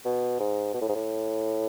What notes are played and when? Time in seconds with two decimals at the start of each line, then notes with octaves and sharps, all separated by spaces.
0.05 B2
0.39 G#2
0.74 B2
0.81 A2
0.89 G#2
0.95 A2